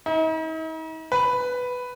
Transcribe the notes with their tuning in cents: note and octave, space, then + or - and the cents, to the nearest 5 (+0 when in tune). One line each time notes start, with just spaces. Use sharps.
D#4 +45
B4 +5